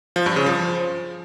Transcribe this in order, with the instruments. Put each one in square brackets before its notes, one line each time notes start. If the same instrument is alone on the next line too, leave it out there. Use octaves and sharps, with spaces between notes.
[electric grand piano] F3
G2
C#3
F3